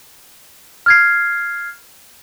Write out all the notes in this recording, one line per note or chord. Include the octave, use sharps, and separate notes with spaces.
F6 G#6 C7